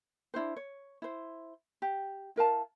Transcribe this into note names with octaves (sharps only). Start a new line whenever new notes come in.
D4 E4 F4 C5
C#5
E4 C5
G4
E4 A#4 F5 A5